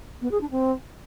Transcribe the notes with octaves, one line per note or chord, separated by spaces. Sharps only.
B3
G#4
D4
C4